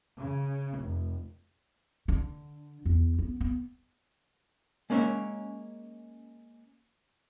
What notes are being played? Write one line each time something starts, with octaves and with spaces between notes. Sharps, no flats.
C#3
F1
D3
E2
B3
B3
G#3 A#3 C#4 C#5 E5